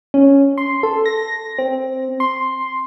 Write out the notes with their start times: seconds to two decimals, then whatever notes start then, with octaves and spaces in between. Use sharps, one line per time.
0.14 C#4
0.58 C6
0.83 A4
1.06 A#6
1.59 C4
2.20 C6